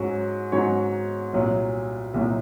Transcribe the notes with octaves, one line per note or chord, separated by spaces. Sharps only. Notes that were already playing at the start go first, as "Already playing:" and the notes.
Already playing: G#2 F#3 C#4 F#4
G#2 F#3 C#4 F#4 C#5
C2 A#2 F#3
C2 A#2 F#3